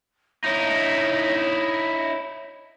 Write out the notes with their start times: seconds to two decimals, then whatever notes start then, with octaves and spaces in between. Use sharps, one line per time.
0.45 D#4 E4 C#5